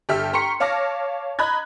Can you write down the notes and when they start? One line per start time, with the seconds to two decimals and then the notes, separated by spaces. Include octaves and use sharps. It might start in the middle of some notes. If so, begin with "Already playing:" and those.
0.09 G1 G4 A4 E5 F6
0.33 G5 A#5 C6 C#6 B6 C#7
0.60 C#5 F5 A5 D6 F6 A#6
1.39 D#5 A#5 B5 F#6 G#6